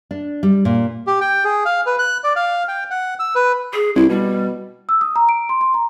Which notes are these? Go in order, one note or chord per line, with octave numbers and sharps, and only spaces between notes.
D4
G3
A#2
G4
G5
G#4
F5
B4
F#6
D5
F5
G5
F#5
E6
B4
G#4
C2 E4
B2 G3
E6
D#6
A#5
D7
C6
C6
A#5